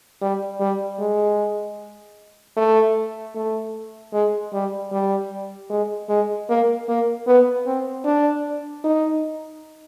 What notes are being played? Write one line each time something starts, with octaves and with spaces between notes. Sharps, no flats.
G3
G3
G#3
A3
A3
G#3
G3
G3
G#3
G#3
A#3
A#3
B3
C4
D4
D#4